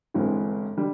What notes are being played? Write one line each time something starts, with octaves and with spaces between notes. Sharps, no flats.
G1 G2 E3 G#3 C4
D3 G3